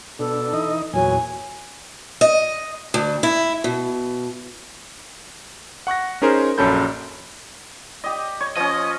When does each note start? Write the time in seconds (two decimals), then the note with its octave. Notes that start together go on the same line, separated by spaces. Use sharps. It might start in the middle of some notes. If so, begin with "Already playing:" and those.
0.19 B2 D4 A4
0.54 E3 D#4 D#5
0.94 E2 A#2 F#3 G#5
2.21 D#5
2.94 D2
3.23 E4
3.64 B2
5.87 F#5 C#6 F#6 A#6
6.22 C#4 D#4 G#4 A#4 C5
6.58 A#1 F#2 C#4 A4 B5 G6
8.04 G4 D#5
8.40 C#5
8.57 F3 C#4 D#5